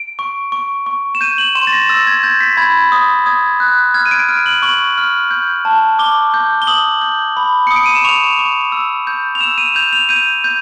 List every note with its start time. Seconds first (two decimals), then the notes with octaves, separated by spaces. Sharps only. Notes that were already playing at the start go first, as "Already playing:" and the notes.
Already playing: D7
0.19 C#6
0.52 C#6
0.86 C#6
1.15 E7
1.21 G6 D#7
1.38 F#7
1.55 C6 E7
1.67 A6
1.73 A#6
1.89 E6 A6
2.07 G#6
2.23 G6 A6
2.41 B6
2.57 B5 G#6
2.92 D#6
3.26 D#6 G#6
3.60 F#6
3.94 F6 G#6
4.06 D#7
4.11 D7
4.29 F6 D7
4.46 F#7
4.62 C#6 F#7
4.98 F6
5.31 G6
5.65 A5
5.99 D6 G7
6.34 G6
6.62 G7
6.67 D#6 F#7
7.01 G6
7.37 B5
7.67 D#6 C#7
7.76 D7
7.86 D#7
7.95 E7
8.04 C#6 F7
8.39 C#6
8.72 E6
9.07 G6
9.35 F7
9.41 E6 E7
9.58 D#7
9.75 G6 F7
9.93 F7
10.09 G6 D#7
10.44 G6